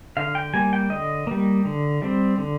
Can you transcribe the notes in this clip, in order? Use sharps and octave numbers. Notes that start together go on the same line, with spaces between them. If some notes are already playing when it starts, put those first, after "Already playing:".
D3 F5
G5
G3 A#3 G#5
G5
D3 D#5
G3 A#3
D3
G3 C4
D3